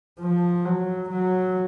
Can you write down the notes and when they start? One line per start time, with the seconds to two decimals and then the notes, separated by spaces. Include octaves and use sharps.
0.20 F3
0.65 F#3
1.10 F#3